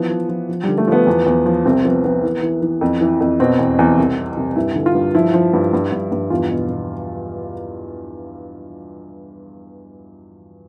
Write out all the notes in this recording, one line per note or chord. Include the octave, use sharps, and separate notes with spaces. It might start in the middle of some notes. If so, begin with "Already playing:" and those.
Already playing: E3 F3 B3
F3
F3
F3
D3 G3
A3
F3 B3
E2
E2
F3
C2 C4
F3 B3
F3 B3
E3
E3
E3
F2
E3
F2
B2 C4
E2
E2
C2
C3
C2
G2 E4
D3
F4
G2
F3 E4
F3
G2
G2
G2
G2
E2 F4
B2
B2